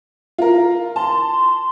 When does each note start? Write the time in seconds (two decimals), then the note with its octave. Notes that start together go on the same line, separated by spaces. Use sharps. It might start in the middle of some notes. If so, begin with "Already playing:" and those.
0.38 F4 A#4
0.96 A5 C6